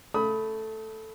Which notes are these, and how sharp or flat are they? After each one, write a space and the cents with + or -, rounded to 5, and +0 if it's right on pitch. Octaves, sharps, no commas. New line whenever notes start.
A3 +0 B5 +0 D#6 +30